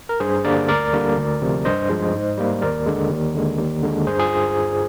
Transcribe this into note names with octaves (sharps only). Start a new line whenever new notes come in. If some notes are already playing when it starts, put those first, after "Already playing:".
A#4
G2 G#4 C5
D3 G3 A#3 A#4 D5
D2 A#4 D5
D3 G3 A#3
D2
C3 F3
G2 C5 D#5
F3 G#3
G#2
G3 A#3
D#2 A#4 D5
D3 G#3
D#2
D3 G#3
D#2
D3 G#3
G2 G#4 C5
F4 G#4